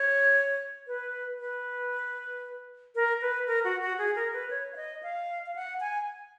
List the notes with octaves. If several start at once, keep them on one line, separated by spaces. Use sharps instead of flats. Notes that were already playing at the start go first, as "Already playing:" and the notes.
Already playing: C#5
B4
B4
A#4
B4
A#4
F#4
F#4
G#4
A#4
B4
C#5
F5
D#5
F5
F5
F#5
G#5